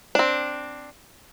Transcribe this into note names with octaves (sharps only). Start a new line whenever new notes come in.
C4 D4